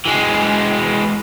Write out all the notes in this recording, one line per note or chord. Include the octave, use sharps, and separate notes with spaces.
E3 G#3